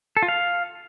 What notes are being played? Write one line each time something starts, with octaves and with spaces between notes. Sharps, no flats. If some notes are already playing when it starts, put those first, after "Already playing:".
A4
F4
F5